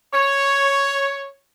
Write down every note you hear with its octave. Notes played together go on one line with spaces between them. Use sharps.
C#5